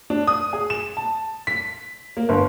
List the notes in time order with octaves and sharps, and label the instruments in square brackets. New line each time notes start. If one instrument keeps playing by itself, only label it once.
[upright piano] D4
D#6
G#4
E7
A5
B6
A#3
G1